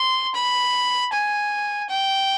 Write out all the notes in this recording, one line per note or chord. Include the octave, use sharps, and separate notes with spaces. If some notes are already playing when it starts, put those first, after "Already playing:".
Already playing: C6
B5
G#5
G5